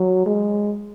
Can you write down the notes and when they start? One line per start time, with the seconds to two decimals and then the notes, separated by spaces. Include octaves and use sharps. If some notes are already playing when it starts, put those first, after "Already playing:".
Already playing: F#3
0.26 G#3